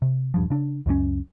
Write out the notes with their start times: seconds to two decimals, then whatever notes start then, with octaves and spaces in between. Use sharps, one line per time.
0.02 C3
0.34 D#1 G2 F3
0.50 C#3 D4
0.86 C#2 F#2 A3 C#4